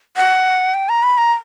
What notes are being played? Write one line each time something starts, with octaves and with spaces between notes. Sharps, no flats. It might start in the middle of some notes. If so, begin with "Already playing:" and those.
F#5
G5
A#5
B5
A#5